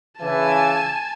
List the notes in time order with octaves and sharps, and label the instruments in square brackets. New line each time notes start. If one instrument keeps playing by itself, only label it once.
[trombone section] C#3 E3 [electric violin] G#5 A5